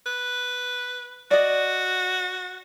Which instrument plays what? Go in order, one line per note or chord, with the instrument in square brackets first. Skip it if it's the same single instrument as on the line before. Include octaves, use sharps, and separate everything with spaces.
[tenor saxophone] B4
[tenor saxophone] F#4 [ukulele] D5 D#5